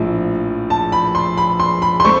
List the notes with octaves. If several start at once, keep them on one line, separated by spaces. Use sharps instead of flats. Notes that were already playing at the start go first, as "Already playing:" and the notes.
Already playing: A#1 A2 F3
A5
B5
C6
B5
C6
B5
C6
A3 C4 C#6